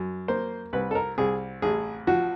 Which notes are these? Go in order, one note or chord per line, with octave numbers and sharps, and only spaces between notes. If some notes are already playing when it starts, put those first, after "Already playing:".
Already playing: F#2
A#3 C5
C2 B4
A4
A#4
C2 G#4
A1 G#4
F3 F#4